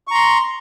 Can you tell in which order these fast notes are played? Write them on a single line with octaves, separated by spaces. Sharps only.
C#6 A#5 C6